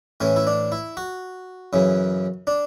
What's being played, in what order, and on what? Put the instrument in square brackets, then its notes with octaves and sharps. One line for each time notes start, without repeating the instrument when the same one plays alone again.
[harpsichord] A2 E3 C#4
E4
D4
E4
F#4
F#2 C#3 E3
D4